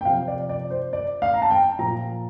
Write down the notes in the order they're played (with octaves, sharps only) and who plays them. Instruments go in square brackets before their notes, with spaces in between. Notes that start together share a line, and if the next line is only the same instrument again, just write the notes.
[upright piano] G5
C3 F3 F5
D5
D5
C5
D5
F5
A#5
A5
G5
A#2 F3 A#5